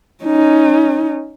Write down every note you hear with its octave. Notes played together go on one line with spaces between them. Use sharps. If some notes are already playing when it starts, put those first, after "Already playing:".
C#4 D#4